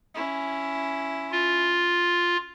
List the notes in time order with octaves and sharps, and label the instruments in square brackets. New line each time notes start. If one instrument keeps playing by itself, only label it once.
[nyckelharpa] C#4 E4
[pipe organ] F4